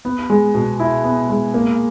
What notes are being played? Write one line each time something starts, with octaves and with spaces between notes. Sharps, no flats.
B3
G#3
B2
E4
B3
G#3
A#3